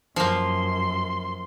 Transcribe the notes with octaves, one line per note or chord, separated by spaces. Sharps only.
F#2 F3 A#3 C6